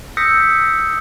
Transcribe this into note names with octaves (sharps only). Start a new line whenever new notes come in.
D#6 E6 G6 A#6 B6 C#7